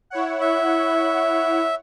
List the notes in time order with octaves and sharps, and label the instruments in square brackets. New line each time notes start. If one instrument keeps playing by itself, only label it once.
[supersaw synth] E4 C#5 F#5
[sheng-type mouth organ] E5